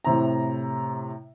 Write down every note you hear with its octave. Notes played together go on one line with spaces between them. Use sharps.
A2 C3 A#5